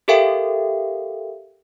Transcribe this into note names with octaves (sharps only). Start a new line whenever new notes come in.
G4 A4 A#4 E5 F5 G5